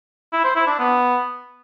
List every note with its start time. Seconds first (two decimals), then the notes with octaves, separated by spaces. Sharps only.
0.32 E4
0.44 C5
0.55 E4
0.67 D4
0.78 B3